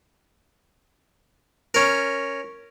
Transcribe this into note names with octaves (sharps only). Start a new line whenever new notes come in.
C#4 A#4